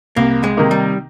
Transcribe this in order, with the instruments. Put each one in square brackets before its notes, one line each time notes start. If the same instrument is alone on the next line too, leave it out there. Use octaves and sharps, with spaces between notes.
[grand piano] C2 [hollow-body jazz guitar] A#3
[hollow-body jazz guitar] G#3
[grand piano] C3 D#3 A#3 D#4
[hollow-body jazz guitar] G3